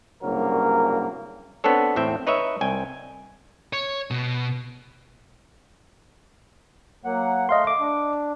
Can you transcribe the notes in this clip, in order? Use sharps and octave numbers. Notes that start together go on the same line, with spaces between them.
C2 G2 C#3 F#3 A#3 A#4
B3 C4 D4 A4 C#5
E2 A2 C4 E5 G5
D#4 B4 C#5 D#5 E5
C2 G5 G#5
C#5
B2
F#3 A#3 F#5
A3 D#5 F5 C6
D6
D4